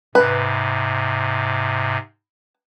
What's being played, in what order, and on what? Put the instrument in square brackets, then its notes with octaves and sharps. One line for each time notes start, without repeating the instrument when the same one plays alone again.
[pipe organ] G#2 C3 [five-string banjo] B4